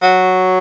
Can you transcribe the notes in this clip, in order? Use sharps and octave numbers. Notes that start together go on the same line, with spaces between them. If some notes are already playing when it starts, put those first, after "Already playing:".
F#3